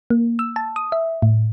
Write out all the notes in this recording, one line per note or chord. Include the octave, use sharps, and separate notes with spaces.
A#3
E6
A5
D#6
E5
A2